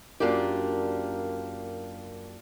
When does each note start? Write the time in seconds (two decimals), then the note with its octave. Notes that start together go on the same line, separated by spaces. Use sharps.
0.20 F#2 A#3 D4 F4 G4